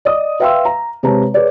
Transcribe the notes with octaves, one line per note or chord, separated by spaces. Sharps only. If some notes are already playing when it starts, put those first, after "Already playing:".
D5 D#5 D#6
B4 E5 F5 G5 C6 E6
A#5
C3 G#3 B4 C#5 A5 A#5
G#4 B4 C#5 D5